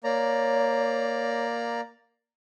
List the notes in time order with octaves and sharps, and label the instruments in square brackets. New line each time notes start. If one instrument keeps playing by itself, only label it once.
[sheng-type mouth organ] A#3 D5 A#5 [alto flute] C#5